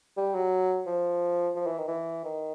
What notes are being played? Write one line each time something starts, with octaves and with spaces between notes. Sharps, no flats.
G3
F#3
F3
F3
E3
D#3
E3
D#3